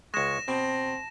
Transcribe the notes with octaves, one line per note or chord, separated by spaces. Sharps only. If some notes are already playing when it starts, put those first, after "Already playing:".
C#2 G#3 C#6 A#6 E7
B2 C4 A5